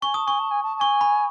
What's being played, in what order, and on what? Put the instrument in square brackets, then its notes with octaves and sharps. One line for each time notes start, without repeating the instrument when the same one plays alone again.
[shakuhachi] G#5 [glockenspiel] C#6
[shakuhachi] A5 [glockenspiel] D#6
[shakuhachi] G#5 [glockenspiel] C#6
[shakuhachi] A5
G#5
A5
A5
[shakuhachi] G#5 [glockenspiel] C#6
[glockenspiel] B5